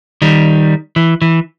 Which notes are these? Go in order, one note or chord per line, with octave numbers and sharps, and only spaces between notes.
D#3 G3
E3
E3